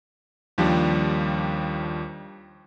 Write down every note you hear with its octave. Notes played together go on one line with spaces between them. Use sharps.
D#2 F3 G3 D4 G4